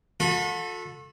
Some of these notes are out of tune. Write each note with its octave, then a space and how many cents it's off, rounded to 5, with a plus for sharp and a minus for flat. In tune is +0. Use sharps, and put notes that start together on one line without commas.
F#4 -45 A4 +0 B5 +0